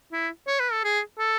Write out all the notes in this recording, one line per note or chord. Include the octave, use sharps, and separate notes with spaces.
E4
C#5
B4
A4
G#4
A4